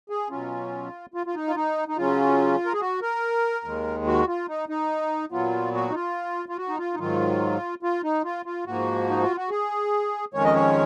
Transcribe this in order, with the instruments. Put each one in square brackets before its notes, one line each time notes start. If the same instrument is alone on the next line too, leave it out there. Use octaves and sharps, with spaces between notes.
[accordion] G#4
B2 F#3 C#4 F4
F4
F4
D#4
F4
D#4
D#4
C#3 F#3 C#4 F4
A#4
G#4
F#4
A#4
D#2 D#3 G#3
F#4
F4
D#4
D#4
A#2 F#3 B3 F4
F#4
D#4
F4
F4
F#4
D#4
F4
D#4
G#2 D#3 F#3 F4
F4
D#4
F4
F4
G#2 F3 A#3 F#4
D#4
F4
F#4
G#4
F2 D#3 G#3 C#4 C#5
D#5
C#5